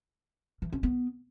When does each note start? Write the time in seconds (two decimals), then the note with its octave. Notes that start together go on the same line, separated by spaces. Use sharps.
0.62 E3
0.72 C#4
0.83 B3